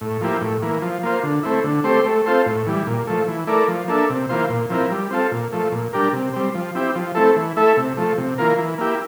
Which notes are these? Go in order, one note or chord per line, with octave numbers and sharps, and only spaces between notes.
A2
F3 A#3 E4 G4
A2
E3 A#3
F3
A#3 F4 C5
D3
A3 C4 E4
D3
A3 C4 G4 C5
A3
C4 F4 A4 C5
A2
E3 G3
A#2
F3 A3
E3
A3 E4 A#4 D5
F3
A#3 D4 A4 E5
C3
E3 A#3 F4 C5
A#2
F3 C4 E4 A#4
G3
C4 F4 A4
A#2
F3 A3
A#2
G3 D4 G4 A#4
C3
G3 C4
F3
C4 E4 G4
F3
A3 C4 E4 A4
E3
A3 E4 A4 E5
C3
F3 A3
C3
E3 A#3 F4 A#4
E3
A#3 E4 G4